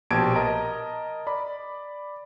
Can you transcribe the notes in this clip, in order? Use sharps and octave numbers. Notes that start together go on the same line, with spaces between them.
A#1 B2 G4 A5 G#6 D7
A#4 D#5 A5 A#5
D5 B5